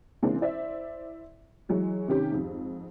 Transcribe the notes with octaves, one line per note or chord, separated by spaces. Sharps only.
C#3 E3 G#3 A#3 C4 D4
E4 C5 D5 E5
E3 F#3 G#3
C3 D#3 C#4 G4
F2 G#2